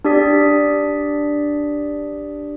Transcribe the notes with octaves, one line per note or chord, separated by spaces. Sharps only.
D4 G4 D5 D#6 B6